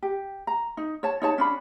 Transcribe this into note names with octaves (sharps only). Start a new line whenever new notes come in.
G4
A#5
D#4
C#5 A5
D#4 C#5 A5
C#4 D4 B5